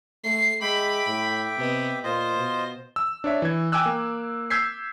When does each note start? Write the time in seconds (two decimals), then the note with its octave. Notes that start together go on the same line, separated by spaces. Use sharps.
0.24 A3 C7
0.61 G#3 E5 G5 B5 D6
1.07 A2
1.58 C3 B3 D#5
2.04 A#2 F4 C5 D#5
2.37 B2
2.96 E6
3.24 D4 C#5 E5
3.42 E3 G#6
3.72 G5 G#5 D6 E6 F#6
3.86 A#3
4.50 E6 G6 G#6 B6 C7